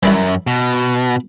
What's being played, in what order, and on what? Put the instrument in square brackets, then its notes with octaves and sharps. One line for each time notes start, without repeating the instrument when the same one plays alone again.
[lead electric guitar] F#2 [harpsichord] E3 G3 E4
[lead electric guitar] B2